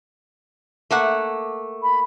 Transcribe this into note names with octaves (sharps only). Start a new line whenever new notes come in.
A3 A#3 F#5
B5